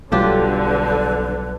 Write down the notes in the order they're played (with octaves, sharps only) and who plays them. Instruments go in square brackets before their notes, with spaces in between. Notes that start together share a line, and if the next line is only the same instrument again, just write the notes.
[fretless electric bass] B1 F#3 G3 [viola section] D3 [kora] D4 F4 G4 [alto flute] B4